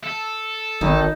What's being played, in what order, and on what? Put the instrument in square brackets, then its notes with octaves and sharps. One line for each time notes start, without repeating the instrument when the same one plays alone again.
[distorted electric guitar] A4
[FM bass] G#1 [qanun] D#4